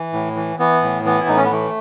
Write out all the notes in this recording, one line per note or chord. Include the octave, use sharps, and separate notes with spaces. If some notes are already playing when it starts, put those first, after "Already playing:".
Already playing: E3
A2
E3
E3 B3
A2
E3 B3
E4
A2 D#4
C#4
B3
E3 A3